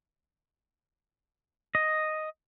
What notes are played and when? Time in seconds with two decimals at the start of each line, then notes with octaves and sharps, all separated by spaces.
1.75 D#5